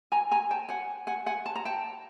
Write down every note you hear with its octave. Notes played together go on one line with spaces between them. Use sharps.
G#5 A#5
G#5 A#5
G5 A5
F#5 G#5
F#5 G#5
F#5 G#5
A5
A#5
G5 A5